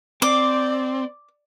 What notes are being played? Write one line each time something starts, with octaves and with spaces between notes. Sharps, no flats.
C4 D5 D6